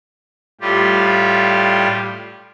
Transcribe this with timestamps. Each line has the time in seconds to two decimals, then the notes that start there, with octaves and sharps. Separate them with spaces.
0.61 A2 G3 F4 G4